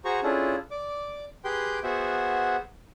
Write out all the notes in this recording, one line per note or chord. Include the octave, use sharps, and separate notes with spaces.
F#4 G#4 C5 A#5 C#6
C#4 D4 E4 F4 G#4 A4
D5 D6
G4 G#4 B4 G5 C6 G6
B3 F#4 G#4 C5 E5 F#5